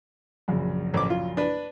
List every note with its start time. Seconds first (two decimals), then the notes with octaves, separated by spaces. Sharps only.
0.48 A#1 F#2 C#3
0.94 A1 D6
1.10 F4
1.37 D4 B4